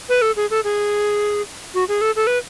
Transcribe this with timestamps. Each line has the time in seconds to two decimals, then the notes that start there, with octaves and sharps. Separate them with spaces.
0.09 B4
0.22 A4
0.36 G#4
0.51 A4
0.64 G#4
1.74 F#4
1.89 G#4
2.01 A4
2.16 A4
2.27 B4